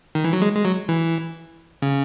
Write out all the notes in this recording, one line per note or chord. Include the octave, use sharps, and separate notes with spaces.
D#3
E3
F#3
G#3
G#3
F#3
E3
C#3